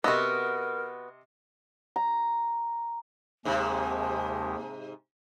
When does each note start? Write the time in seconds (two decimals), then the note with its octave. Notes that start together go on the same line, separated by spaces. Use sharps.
0.04 C3 B3 F#4 A#4 D#5 E6
1.96 A#5
3.45 D#2 G#2 C3 G#3 G4 G#4 G#5 A5